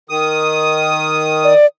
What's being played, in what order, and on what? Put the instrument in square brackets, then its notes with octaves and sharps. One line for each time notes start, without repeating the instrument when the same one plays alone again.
[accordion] D#3 D#6
[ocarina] D5